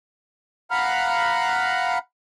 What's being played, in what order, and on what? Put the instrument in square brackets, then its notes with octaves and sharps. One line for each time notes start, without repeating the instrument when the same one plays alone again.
[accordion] F5 F#5 A#5 B5 F6 F#6